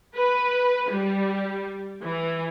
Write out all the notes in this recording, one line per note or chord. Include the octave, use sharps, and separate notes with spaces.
B4
G3
E3